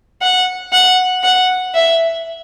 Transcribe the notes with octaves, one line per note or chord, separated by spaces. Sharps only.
F#5
F#5
F#5
E5